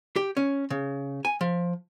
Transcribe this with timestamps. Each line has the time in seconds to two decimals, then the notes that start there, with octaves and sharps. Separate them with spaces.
0.16 G4
0.37 C#4
0.70 C#3
1.25 G#5
1.41 F3